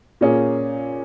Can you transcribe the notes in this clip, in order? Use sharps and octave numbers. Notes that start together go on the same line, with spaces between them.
A#2 A#3 C#4 G#4